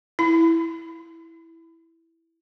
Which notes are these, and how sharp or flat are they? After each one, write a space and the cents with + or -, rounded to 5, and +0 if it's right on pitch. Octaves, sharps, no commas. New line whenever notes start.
E4 +0 B5 +30